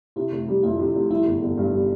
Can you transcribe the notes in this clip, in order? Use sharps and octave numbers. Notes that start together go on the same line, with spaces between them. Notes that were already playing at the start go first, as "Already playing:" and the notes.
C3 E4
F1
G3
F2 E4
C3
F1
G3 E4
G1
G1
G2
G3